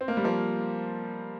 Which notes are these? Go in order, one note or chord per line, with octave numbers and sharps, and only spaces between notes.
C4
A#3
G3
F3 A#3